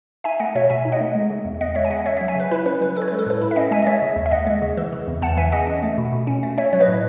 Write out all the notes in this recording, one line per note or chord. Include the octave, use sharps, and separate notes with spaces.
D#4 E5 G#5
A3 D#5 F#5
B2 C#5 E5
B2 E5 G#5
D#4
D#5 F#5
A3
G#3
C#3
E2
E2 D#5 F#5
G#3 C#5 E5
G#5
C#3 D#5 F#5
C#4 C#5 E5
C#5 E5
F#3
E5 G#5
C#3 B4
E4 B4
C#4 B4
F#3 B4
C#4 A4
C#5
B4
G#3
A4
A2 B4
E4
E5
C#4 D#5 F#5
G#3 E5 G#5
D#5
G#3 C#5 E5
C#3
D#2
E5
D#2 D#5 F#5
G#3
C#3
E3
C#3
E2
E2 F#5 A5
E3 E5 G#5
C#3 D#5 F#5
C#4
A3
B2
B2
C#4
A3
C#4 C#5 E5
F#3 C#5
B4 D#5
A2